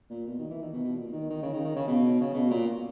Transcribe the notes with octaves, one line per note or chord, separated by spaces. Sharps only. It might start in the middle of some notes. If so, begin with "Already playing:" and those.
A#2
B2
D#3
E3
D#3
B2
B2
A#2
D#3
D#3
C#3
D#3
D#3
C#3
B2
C#3
B2
A#2